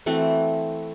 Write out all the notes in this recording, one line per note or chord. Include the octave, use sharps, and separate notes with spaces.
E3 A3 C4 F#4